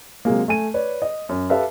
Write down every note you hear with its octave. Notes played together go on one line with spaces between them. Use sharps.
C3 F#3 G#3 A#3
A3 G#5 D#7
B4 C#5 D5
D#5
F#2
G4 A4 B4 E5 F5